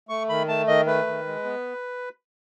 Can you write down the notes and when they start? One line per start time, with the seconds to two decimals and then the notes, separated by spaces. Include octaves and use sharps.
0.09 A3 C#6
0.29 D#3 B5
0.48 A3 A5
0.67 D#3 D#5
0.86 A3 B4
1.07 D#3
1.26 G#3
1.44 B3